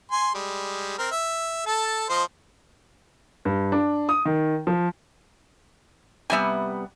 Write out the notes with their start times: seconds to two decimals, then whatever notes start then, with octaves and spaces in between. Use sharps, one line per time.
0.12 G#5 C6
0.35 G3 G#3
0.98 C4 A#4 F6
1.11 E5
1.66 A4 A5
2.09 F3 C5 D#5
3.45 G2
3.72 D4
4.09 D#6
4.25 D#3
4.67 F3
6.30 C3 G3 B3 E5 G#5